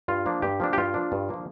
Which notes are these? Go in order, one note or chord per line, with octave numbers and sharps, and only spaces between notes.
G2 F4
F3 A#3 D4
G2 G4
F3 A#3 D4
G4
G2 F4
F3 A#3 D4
G2
F3 A#3 D4